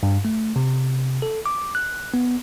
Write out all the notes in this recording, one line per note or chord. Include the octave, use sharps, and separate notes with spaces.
G2
A3
C3
A4
D6
F#6
B3